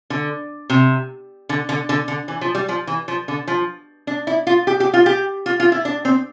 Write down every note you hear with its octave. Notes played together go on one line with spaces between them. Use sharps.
D3
C3
D3
D3
D3
D3
E3
F3
G3
F3
E3
F3
D3
F3
D4
E4
F4
G4
G4
F4
G4
F4
F4
E4
D4
C4